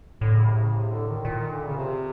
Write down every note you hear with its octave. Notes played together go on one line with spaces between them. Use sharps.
A2 D3
C#3
C3
C#3
C3
D3
D#3
A#2
D#3
D3
C#3
C3